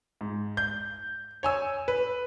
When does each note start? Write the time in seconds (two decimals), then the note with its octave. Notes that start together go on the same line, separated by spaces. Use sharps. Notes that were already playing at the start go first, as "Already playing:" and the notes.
0.21 G#2
0.57 G6
1.43 C#5 G#5 E6
1.88 B4